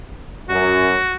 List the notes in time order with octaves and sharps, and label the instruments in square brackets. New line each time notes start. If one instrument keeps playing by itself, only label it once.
[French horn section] F#2 [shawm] F#4